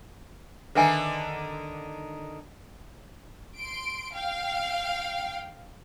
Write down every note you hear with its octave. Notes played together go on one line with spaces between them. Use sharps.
D3 D#3 D#4 B4 E5 G#5
C6 D7
F5 G5